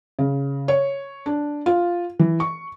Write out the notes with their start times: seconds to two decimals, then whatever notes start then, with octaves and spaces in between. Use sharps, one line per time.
0.19 C#3
0.68 C#5
1.26 D4
1.66 F4
2.19 E3
2.40 C#6